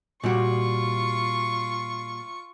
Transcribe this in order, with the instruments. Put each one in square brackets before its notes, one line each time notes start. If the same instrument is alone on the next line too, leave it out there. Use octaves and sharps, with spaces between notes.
[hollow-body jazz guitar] A#2 G3 F#4 [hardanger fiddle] F4 C#6